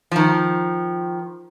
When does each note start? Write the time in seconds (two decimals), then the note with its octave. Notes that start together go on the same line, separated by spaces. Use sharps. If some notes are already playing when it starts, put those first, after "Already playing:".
0.11 D#3 F3